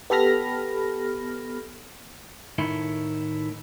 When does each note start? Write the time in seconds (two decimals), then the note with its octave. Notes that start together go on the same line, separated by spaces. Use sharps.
0.10 B3 G4 A4 B5 F6 A#6
2.58 A2 D#3 A3 E4